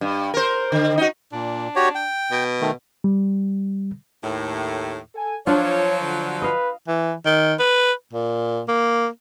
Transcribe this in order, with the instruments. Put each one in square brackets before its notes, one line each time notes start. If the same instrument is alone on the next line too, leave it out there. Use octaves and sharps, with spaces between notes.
[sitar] G2
A#4 C5
D3
D#4 F#4
[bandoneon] A#2 [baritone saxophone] D4
[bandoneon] F#4 G4 C#5
G5
[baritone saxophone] B2
[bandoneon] D#3 A3
[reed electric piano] G3
[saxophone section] D#2 A2
[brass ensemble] A4 G#5
[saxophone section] F3 F#3 [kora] D4 F4 [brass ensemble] C#5
[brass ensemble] D3
[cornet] B4 [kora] D#5 F5
[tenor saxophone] E3
D#3
B4
A#2
A#3